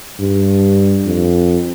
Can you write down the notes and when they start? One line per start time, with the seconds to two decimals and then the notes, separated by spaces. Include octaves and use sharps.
0.20 G2
1.06 F2